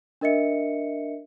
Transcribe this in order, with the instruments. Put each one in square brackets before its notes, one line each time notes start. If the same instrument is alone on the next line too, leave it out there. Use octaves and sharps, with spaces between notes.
[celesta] D4 A#4 D#5 E5 C#7